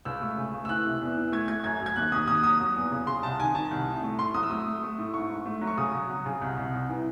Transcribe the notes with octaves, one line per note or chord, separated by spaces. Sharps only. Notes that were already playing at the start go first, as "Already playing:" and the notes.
C#2 E6
A3
C#3
A3
E6
E3 F#6
C3
E2
E3
A3 G#6
A3 G#6
F#2 G#6
F#2
G#6
D#2 F#6
D#2 D#6
D#2 D#6
F#3 D#6
F#3
E2
C#3
C#3 C6
C2 A5
D#3 G#5
D#3 A5
C2
A2
A3
A2 C6
F#3 D#6
E6
A3 D#6
A3
A3
A2
G#2 C#6
G#2
A3
F#3
C#6
C#3 D#6
F#3
F#3
C#3
C2
C2
C2
E3